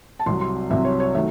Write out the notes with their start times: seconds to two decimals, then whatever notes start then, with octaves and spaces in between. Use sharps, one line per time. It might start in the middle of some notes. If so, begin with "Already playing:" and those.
0.19 A5
0.26 C2 C3 F#3 C6
0.41 C6
0.70 C2 C3 F#3 E5
0.85 C#5
1.00 C#5
1.15 D#3 F#3 A3 E5